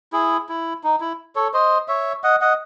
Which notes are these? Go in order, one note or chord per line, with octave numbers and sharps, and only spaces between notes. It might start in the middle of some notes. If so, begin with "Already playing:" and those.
E4 G#4
E4
D#4
E4
A4 C#5
C5 D#5
C#5 E5
D#5 F#5
D#5 F#5